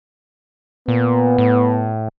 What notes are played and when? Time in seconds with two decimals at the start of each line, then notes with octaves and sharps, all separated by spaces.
0.88 A#2 B3
1.38 A2